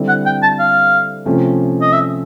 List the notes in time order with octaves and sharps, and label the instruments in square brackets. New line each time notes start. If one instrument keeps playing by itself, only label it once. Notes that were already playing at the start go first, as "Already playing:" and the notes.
Already playing: [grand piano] D3 G3 C4 E4
[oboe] F#5
G5
A5
F5
[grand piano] C3 F3 A3 C#4
[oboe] D#5
E5